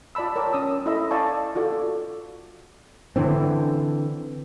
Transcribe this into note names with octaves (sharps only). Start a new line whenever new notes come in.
F4 D5 A5 B5 E6
A#4 C#5 G5 A5 D6
C#4 D#6 E6
E4 A4 D#5 E5 B5 E6
D5 F5 G#5 A5 C#6
F4 F#4 A4 D5
D3 E3 C4